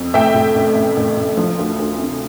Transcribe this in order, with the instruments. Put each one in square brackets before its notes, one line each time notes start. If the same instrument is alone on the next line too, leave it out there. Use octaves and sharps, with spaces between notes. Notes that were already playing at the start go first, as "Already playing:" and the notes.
Already playing: [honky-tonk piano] F2
A2 E5 G5
A2
A1
A1
A1
A1
F3
D2
D2
C3